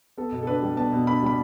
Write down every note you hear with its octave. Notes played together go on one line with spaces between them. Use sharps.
B3 A4
B2
A4
D4 B4
G3
B3 A5
B2
D4 B5
G3 B5